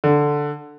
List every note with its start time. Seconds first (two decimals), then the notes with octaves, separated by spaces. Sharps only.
0.04 D3